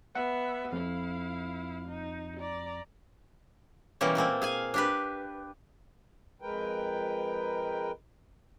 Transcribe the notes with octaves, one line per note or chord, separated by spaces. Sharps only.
B3 E5 F#5
F2 E4 F5
D#4
D5 A#5
B2 E3 F#3 G3 A#3 C#4
A#2 A3 A#3 C4
G#4 F5 G#5
D4 G4 B4
F2 G#3 A#4 B4 G5